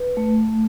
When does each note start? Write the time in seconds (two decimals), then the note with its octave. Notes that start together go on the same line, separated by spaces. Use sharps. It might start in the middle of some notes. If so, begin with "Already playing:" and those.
Already playing: B4
0.17 A3